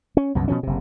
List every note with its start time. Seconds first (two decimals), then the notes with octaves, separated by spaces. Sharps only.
0.17 C#4
0.35 C2 F#2 B2
0.48 B2 F3 C#4
0.63 F#1 C3